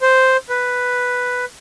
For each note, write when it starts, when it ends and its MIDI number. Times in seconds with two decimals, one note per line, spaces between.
0.01 0.37 72
0.49 1.45 71